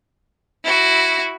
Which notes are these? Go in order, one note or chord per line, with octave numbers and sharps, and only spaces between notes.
E4 F#4